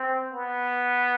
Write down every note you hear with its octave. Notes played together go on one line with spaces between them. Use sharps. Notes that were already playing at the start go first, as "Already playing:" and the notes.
Already playing: C4
B3